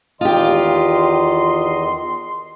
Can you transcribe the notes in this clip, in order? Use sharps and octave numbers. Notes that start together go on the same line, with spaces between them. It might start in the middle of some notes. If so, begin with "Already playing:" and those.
E2 D#3 F4 G4 D#5 C6